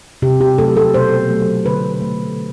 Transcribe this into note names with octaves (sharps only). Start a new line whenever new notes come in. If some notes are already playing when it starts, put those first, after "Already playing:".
C3 G4
G4
F#3 A3 A4
A4
B2 C5
F#3 A3
D3 B4
A3